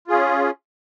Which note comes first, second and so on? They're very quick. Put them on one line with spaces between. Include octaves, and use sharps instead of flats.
F4 G#4 C#4